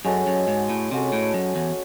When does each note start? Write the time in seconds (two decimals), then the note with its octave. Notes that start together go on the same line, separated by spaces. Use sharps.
0.05 F#2 G#3 C#4 F#4 A4
0.27 F#2
0.48 G#2
0.69 A2
0.91 C3 G#3 C#4 F#4 A4
1.13 A2
1.34 F#2
1.56 E2